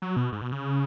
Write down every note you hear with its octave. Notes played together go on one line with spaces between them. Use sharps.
F#3
B2
G#2
B2
C#3